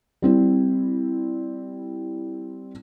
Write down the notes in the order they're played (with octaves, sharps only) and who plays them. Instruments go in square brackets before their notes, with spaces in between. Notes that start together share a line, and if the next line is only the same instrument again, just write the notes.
[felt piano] G3 C4 E4